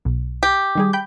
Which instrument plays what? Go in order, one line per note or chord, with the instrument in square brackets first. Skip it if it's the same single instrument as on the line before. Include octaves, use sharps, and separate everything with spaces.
[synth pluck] B1
[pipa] G4
[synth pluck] D#3 G3 G#4
G5 B5 G6